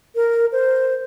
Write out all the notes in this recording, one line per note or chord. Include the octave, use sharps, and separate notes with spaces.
A#4
C5